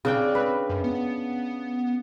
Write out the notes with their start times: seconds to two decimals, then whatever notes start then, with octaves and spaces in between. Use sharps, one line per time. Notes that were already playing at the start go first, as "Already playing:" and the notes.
0.05 C#3 C4 D4 G5
0.35 B4
0.69 F#2
0.84 B3